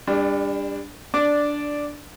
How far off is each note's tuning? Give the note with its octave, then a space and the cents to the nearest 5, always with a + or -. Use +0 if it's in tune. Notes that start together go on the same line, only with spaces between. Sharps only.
G3 +35 D4 +0
D4 -5 D5 +0